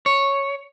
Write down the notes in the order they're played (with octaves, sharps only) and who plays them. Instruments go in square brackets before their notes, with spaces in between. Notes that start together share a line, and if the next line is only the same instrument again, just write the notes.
[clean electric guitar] C#5